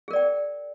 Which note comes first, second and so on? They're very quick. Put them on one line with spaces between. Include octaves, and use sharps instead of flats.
G#4 A#4 D5 G5